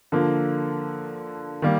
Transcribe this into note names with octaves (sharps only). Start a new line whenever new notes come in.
D3 F3 A#3
D#3 G3 A#3